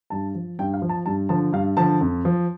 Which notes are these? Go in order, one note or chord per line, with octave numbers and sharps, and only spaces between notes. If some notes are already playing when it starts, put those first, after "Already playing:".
G2 A5
F3
G2 G5
F5
F3
A5
G2 A5
D3 F3 A5
G2 F5
D3 F3 A5
F2
F3